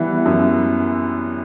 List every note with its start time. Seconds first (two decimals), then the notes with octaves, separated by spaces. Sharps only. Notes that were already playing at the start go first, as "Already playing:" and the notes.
Already playing: E3 G3 B3
0.26 F#2